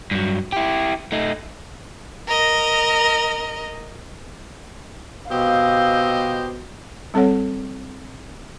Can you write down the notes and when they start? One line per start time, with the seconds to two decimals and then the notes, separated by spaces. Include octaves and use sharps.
0.11 G2 F#3
0.52 E4 G4
1.12 A3 D#4
2.28 A#4 D#5
5.30 B2 C4 G4 C5 D#5 F5
7.14 G3 C4 A4 C#5 F#5